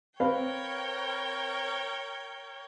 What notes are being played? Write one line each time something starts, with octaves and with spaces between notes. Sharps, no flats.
C4 A#4 B4 C#5 F5 G5